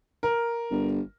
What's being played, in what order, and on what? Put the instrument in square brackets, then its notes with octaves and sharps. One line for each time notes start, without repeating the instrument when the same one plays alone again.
[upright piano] A#4
[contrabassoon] G1